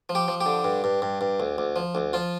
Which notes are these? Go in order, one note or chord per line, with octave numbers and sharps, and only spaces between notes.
F3
G4
F3
G4
D3
G2
G2
G2
G2
D2
D2
F3
D2
F3 F4